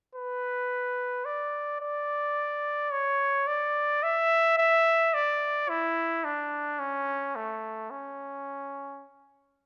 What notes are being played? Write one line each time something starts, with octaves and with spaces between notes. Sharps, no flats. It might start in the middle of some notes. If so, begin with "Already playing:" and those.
B4
D5
D5
C#5
D5
E5
E5
D5
E4
D4
C#4
A3
C#4